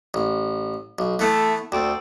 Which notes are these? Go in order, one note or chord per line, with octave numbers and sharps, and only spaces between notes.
A1
B1
E3 A3 B3
D2 C4 A4 D5